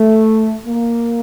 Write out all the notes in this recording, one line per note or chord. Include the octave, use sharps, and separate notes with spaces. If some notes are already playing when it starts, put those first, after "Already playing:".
Already playing: A3
A#3